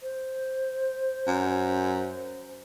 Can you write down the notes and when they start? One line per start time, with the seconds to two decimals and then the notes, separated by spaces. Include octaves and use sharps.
0.02 C5
1.27 F#2